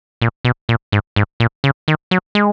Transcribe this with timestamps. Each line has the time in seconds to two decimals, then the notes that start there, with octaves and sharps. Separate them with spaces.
0.22 A#2
0.45 B2
0.69 A#2
0.92 G#2
1.16 G#2
1.40 A#2
1.64 C#3
1.88 D#3
2.11 F#3
2.35 G#3